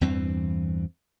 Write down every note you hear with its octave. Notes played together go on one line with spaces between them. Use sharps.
E2 G2 E3 C4